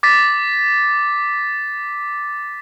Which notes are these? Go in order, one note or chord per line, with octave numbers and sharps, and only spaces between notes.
D6 A6 B6